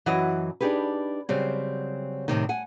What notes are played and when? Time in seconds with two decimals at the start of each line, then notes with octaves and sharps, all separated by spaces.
0.06 F#2 E3 F#3 E4 F#4 D#5
0.61 D4 D#4 G4 G#4 B4
1.29 C#3 F#3 G3 C4
2.28 A2 C3 D#3
2.49 F#5 G#5